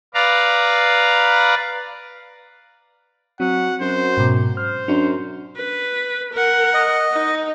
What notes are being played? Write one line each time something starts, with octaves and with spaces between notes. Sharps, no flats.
B4 D5 F5 A#5
F#3 C4 F#5
F#2 C5
G#2 B2
C5 F6
F#2 D4
B4
A#4 F#5
D#5
D#4